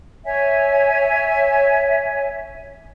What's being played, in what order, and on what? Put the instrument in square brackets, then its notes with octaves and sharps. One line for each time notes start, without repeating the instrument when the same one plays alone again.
[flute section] C#5 E5 G#5